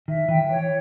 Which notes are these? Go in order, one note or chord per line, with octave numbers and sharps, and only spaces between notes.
D#3 E5
E3 G5
E3 C#5